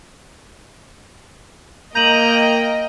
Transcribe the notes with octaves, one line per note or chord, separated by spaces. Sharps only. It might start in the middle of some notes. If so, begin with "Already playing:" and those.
A#3 D#5 G5 A#5 G6 D#7 F#7